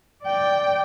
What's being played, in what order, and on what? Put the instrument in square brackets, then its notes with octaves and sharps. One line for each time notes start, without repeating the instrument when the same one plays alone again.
[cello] D5 G5